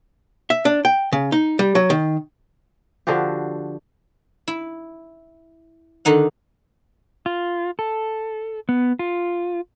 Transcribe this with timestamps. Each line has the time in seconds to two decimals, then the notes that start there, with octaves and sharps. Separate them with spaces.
0.50 E5
0.65 D4
0.85 G5
1.13 C#3
1.32 D#4
1.59 G3
1.75 F#3
1.90 D#3
3.07 D3 F3 F#4 G4
4.48 E4
6.05 D3 D#3 D#4 F#5
7.26 F4
7.79 A4
8.69 B3
8.99 F4